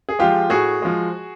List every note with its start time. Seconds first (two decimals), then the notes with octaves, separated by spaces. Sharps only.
0.09 G#4
0.19 F3 G#3 F4 G4
0.50 A2 F#4 G#4
0.82 F3 G#3